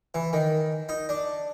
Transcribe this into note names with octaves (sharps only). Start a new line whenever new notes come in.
E3
D#3
D#4
D4